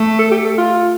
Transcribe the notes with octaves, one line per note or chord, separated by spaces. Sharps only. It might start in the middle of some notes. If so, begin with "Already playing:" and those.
Already playing: A3
A4
G4
A4
F4